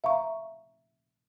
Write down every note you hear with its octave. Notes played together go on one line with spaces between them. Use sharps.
E5 F5 A#5 C#6